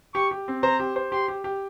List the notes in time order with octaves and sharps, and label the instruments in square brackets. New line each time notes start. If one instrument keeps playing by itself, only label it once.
[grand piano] G4 [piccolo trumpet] C#6
[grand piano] G4
C4
[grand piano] C5 [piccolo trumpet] A#5
[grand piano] G4
C5
[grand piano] G4 [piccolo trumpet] C6
[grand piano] G4
G4